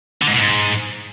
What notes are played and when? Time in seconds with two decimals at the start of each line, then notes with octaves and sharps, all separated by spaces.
0.22 D3
0.27 G#2
0.33 B2
0.39 G#2